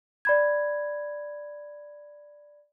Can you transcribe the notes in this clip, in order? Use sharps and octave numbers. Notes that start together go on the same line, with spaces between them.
D5 B5 G#6